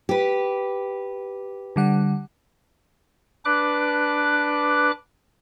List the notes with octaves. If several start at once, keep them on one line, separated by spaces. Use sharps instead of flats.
G4 B4
D3 G3 F#5
D4 B4 D6 F#6